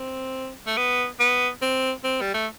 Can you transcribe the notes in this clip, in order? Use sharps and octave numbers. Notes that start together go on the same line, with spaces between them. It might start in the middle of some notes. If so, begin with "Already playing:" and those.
Already playing: C4
A3
B3
B3
C4
C4
G3
A3